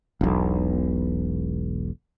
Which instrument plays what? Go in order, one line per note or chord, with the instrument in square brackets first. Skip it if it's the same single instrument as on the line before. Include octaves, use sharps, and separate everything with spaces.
[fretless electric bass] E1 B1